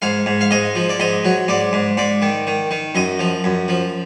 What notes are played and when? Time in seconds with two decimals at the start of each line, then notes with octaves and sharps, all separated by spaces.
0.02 G#2 F5
0.26 G#2
0.41 F5
0.51 G#2 D#5
0.75 F3
0.89 D5
1.00 G#2 D#5
1.25 F#3
1.48 G#2 D5
1.73 G#2
1.97 G#2 D5
2.22 D#3
2.47 D#3
2.71 D#3
2.95 F#2 D#5
3.19 F3
3.44 F#2
3.68 F3